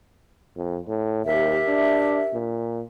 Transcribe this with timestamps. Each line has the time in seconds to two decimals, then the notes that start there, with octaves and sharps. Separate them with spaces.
0.56 F2
0.87 A2
1.25 D#2 G4 A#4 E5
1.68 D4
2.33 A#2